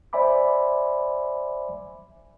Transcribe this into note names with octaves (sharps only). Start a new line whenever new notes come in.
C5 D5 E5 G#5 B5 D6